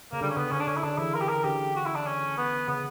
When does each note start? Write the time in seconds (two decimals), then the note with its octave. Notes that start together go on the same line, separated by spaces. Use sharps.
0.12 C#3 A#3
0.21 D3 G3
0.30 C#4
0.36 C#3 B3
0.52 D3 C#4
0.60 D4
0.67 C#3 C#4
0.76 E4
0.83 D3 D4
0.98 E3 E4
1.14 A#4
1.21 G4
1.29 A#4
1.44 D3 G4
1.76 F#4
1.85 E4
1.95 D4
2.06 C#4
2.37 B3
2.68 C#3 B3